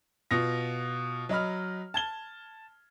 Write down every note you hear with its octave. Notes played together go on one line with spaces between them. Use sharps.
B2 F4 A#6
F#3 D#5 B5 F6
A5 G#6 G7